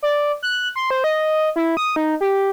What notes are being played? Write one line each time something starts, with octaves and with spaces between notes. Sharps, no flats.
D5
F#6
C6
C5
D#5
E4
D#6
D#4
G4